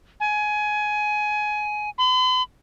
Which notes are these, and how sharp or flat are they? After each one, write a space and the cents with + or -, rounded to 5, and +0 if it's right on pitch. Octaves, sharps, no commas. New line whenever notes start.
G#5 +20
B5 +45